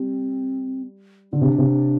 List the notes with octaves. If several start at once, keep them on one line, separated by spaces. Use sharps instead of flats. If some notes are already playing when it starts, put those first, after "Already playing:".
Already playing: G3 C4
D3 D4
C3
C3